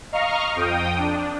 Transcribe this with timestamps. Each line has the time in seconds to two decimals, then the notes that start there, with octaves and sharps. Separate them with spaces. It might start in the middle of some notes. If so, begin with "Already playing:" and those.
0.12 D#5 F5 A#5 C#6 F6
0.56 F2 G5 D#6
0.98 D4